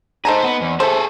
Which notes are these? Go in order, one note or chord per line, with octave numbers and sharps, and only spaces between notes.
D#4 G#4 A4 C5 A#5
B3
E2
A3 G#4 A4 C5